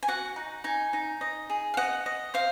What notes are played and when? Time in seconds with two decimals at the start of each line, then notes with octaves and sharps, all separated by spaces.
0.03 G#5
0.08 F#4 F#5
0.36 D#4
0.64 D#4 G#5
0.93 D#4
1.21 D#5
1.50 G#4
1.74 F5
1.77 D#5 F#5
2.06 D#5
2.34 C5 F5